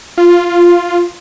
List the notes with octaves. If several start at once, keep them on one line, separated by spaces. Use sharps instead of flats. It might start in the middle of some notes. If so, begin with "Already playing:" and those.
F4